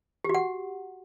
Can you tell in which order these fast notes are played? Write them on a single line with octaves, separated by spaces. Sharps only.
G4 F#4 F#5